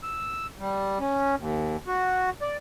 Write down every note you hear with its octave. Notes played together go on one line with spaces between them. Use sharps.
E6
G3
C#4
D#2
F#4
D5